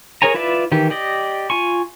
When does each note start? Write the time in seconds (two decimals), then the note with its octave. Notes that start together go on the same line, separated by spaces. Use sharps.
0.22 G#4 A#4 C#5 G#5 A#5
0.34 E4 F4 B4 D5 E5
0.72 D#3 E3 G4
0.90 G4 D5 D#5
1.50 F4 G#5 C#6